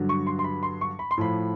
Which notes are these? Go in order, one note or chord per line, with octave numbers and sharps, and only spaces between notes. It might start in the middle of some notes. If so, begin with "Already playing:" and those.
Already playing: G2 D3 F#3
C#6
C6
C6
B5
C6
C#6
B5
C6
A2 F3 B5